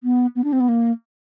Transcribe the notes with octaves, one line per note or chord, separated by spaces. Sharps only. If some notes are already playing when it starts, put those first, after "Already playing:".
B3
B3
D4
C4
B3
A#3